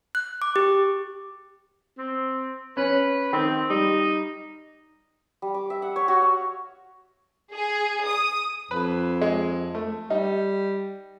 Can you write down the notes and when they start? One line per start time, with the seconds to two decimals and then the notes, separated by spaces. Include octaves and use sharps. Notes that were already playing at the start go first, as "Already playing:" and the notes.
0.15 F#6
0.42 D6
0.56 G4
1.98 C4
2.77 C#4 B4
3.33 D#3 C4
3.70 G3 D#4
5.42 G3
5.54 D6
5.70 E5
5.82 F#5
5.96 C#5
6.08 F#4
6.22 F5
7.52 G#4
8.06 D#6
8.71 F2 B4
9.22 G#3
9.75 A3
10.10 G3 D#4